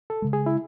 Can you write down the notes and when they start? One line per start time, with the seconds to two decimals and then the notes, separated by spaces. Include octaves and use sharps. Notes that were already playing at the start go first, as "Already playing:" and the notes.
0.10 A4
0.22 C#3 G#3
0.33 G#4
0.46 E4